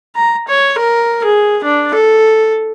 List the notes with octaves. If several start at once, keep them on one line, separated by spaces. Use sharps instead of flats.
A#5
C#5
A#4
G#4
D4
A4